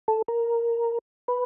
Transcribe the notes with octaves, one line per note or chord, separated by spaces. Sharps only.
A4
A#4
B4